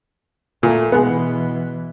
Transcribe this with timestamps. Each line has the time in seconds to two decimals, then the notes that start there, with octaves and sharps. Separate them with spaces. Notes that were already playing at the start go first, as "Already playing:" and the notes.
0.63 A#2 A3
0.92 B2 E3 G#3 B3